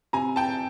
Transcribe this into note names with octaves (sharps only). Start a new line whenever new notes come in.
C3 G#5 A#5
G5 A5